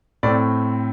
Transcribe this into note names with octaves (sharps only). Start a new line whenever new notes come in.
A2 A3 C4 D5